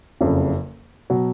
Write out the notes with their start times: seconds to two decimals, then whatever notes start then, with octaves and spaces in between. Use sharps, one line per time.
0.21 F#1 F2 C#3
1.10 B2 F#3